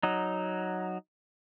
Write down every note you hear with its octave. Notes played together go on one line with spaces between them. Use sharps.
F#3 D#4